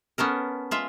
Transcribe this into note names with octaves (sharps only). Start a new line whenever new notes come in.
B3 C#4 A4 A#4
G#3 F4 E5